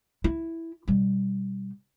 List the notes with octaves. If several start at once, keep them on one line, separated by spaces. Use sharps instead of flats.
E4
B2 G3